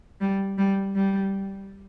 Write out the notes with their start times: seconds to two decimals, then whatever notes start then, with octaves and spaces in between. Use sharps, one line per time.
0.21 G3
0.58 G3
0.95 G3